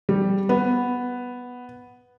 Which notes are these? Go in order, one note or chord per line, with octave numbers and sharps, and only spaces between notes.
G3
B3